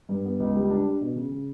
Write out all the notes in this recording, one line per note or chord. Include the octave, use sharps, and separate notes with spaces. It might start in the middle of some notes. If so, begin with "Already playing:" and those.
G2
B3
C#2
G3
D4
D4
B2
C#3
C#3